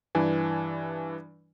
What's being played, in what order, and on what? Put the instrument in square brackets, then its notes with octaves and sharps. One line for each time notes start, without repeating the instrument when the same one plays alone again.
[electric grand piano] G2 E3 D4 G#5